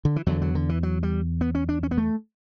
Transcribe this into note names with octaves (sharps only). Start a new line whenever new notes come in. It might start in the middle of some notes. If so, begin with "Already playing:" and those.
D3
E3
E2 D3 F#3
F#3
D3
E3
F#3
G3
B3
C#4
D4
C#4
B3
A3